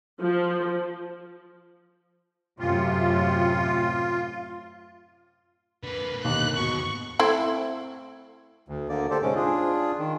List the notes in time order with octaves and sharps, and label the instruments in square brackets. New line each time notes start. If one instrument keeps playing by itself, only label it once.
[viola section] F3
[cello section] F#2 A2 C3 [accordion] F4
[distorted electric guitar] D3 A#3 [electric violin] B4
[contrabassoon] D#2 [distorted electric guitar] B2 D3 [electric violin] F#6
[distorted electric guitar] D#2 G#2 [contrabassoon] B2 [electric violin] C#6
[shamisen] A3 C4 E4
[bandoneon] D2
D2 D3 A#3 D5
G4 A4 C5 D5
G#2 C3 G#3 C#4 D6
D4 F4 G#4
D#3